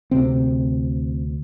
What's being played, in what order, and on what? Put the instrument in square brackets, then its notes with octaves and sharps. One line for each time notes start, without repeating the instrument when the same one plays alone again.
[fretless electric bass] D2 C3 C4